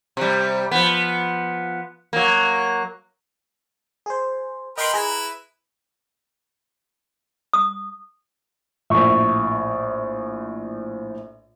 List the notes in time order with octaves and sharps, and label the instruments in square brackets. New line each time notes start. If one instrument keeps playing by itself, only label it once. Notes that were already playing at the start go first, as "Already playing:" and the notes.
[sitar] C3 G3
F3 B3
F#3 A#3
[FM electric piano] G#4 C5
[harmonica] A#4 B4 G5 [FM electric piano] D#5 C6
[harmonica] E4 B4 [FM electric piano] G#4 A#5
[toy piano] D#6
[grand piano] A#1 A2 [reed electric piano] E5 C#6